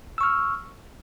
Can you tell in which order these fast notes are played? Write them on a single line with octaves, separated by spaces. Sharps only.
E6 C#6 F6